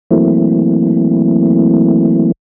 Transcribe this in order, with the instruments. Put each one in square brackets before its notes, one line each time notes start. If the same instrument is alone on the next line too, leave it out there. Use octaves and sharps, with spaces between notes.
[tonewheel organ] E3 F#3 A3 A#3 C4 E4